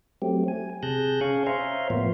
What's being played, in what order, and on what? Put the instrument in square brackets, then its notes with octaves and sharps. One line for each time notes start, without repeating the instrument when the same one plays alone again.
[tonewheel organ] F#3 A3 C4 G4
G#5
C3 G#4 A5 F#6 G6 A#6
C#4 G#4 F5 G#5 C#6
C5 C#5 E5 F5 A#5 C6
A2 F3 A#3 B3